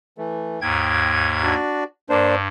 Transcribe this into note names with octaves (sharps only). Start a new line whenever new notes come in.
E3 A3
D#2 G#2 G5 G#6
D4 F#4 D5
G2 A#3 D4 C5